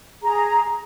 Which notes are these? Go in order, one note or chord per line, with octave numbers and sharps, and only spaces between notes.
G#4 A#5